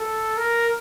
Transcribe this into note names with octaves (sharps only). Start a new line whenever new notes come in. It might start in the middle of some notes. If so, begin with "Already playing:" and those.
Already playing: A4
A#4